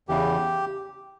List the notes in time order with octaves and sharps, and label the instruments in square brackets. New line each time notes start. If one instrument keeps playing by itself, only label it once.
[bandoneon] E2 C#3 E3 G4